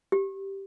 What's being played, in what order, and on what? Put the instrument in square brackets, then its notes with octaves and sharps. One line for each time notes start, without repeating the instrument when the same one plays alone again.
[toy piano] G4